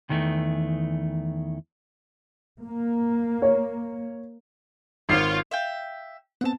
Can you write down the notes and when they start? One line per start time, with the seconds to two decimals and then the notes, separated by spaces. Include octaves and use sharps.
0.09 E2 D#3 E3 G3 A3
2.61 A#3
3.42 C#5
5.09 G#1 F4 C#5 C7
5.51 E5 F5 G5
6.41 B3 C4 F#5 A5